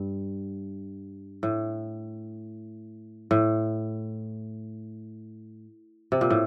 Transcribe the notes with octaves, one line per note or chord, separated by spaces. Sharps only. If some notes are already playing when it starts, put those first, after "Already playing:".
Already playing: G2
A2
A2
C3
A#2
A2